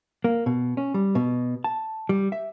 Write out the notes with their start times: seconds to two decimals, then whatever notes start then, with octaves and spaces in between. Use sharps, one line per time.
0.24 A#3
0.46 B2
0.77 C#4
0.94 G3
1.15 B2
1.64 A5
2.09 G3
2.32 E5